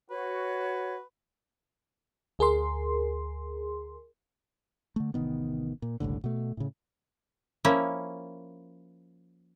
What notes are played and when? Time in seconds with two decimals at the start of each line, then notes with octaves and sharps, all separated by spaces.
0.10 F#4 B4 C#5
2.39 D2 G#4 A#4 C6
4.96 D3 A3
5.14 A1 C3 D#3 B3
5.82 A#2
6.00 F#1 C2 A2 D3
6.24 B2 A3
6.57 A2 C#3
7.65 F3 A#3 C#4 E4